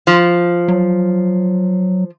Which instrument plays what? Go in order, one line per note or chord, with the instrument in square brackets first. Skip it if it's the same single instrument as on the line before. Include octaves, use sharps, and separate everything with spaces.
[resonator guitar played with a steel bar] F3
[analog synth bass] F#3